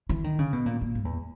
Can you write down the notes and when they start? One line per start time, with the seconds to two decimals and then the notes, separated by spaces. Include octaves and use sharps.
0.09 E3
0.24 D#3
0.39 C#3
0.53 B2
0.66 A#2
0.81 A#2
0.95 G#2
1.05 E2